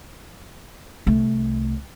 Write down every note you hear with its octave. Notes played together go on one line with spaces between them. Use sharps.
C2 A3